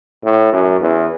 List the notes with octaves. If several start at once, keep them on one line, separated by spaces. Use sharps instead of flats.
A2
F#2
E2